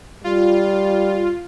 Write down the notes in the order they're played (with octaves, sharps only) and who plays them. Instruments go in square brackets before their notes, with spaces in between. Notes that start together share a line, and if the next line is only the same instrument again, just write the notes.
[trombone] G3 [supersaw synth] F4